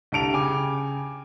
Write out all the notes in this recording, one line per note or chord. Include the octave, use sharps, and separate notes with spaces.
C2 D3 A5 D7 F7
C#3 G5 G#5 D6